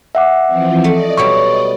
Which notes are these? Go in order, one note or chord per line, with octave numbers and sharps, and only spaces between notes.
E5 F#5 D6
E3 F3 C4
A3 D5 D#5
B2 F#3 G3 C#6